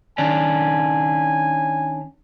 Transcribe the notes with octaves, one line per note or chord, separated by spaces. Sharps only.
D#3 C#4 D4 G#5